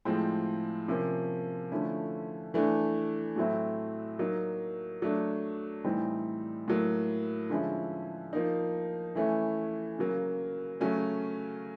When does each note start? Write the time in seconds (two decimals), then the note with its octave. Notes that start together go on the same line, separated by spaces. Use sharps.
0.05 A2 F3 G#3 C4
0.88 C3 F3 A#3 C#4
1.72 D3 F3 A3 C#4 E4
2.54 E3 A3 D4
3.36 A2 F#3 A3 C4 E4
4.19 F#3 A#3 D#4
5.02 F#3 A3 D4
5.84 A2 E3 G3 C4 D#4
6.68 A2 F#3 A#3
7.50 D3 F3 G#3 C#4 E4
8.33 F3 A#3 D#4
9.15 E3 A3 C#4 E4
9.98 C#3 F#3 A#3
10.80 C#3 F#3 A3 C#4